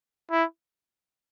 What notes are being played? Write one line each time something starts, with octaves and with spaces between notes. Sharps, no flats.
E4